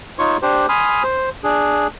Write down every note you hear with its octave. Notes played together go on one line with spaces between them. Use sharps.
D#4 F4 C#5 C#6
D4 G4 C5
G#5 B5 C6 D#6 F6
C5
D4 G#4